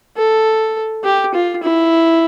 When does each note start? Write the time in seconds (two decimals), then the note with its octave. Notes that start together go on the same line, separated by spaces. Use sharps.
0.17 A4
1.04 G4
1.34 F4
1.64 E4